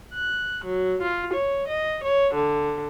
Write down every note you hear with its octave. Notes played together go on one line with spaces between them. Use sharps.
F#6
F#3
F4
C#5
D#5
C#5
D3